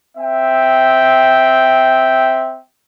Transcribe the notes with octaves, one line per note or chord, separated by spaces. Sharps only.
C4 E5 G5